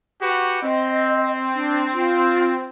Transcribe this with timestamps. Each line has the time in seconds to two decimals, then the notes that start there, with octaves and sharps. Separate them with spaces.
0.21 F#4 G4 B4
0.62 C4 D#5
1.55 D4
1.93 F4